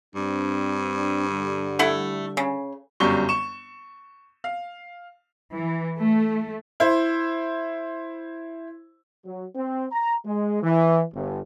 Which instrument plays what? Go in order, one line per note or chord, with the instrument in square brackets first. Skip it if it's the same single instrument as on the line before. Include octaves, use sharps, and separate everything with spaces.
[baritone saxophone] G2 [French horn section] C4 D4
[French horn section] D3 G3
[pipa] A3 E4 F#5
C#3
[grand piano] G1 F#2 G3 C#6 G7
C#6 E7
F5
[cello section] E3
A3
[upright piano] E4 C5
[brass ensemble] F#3
C4
A#5
G#3
E3
G1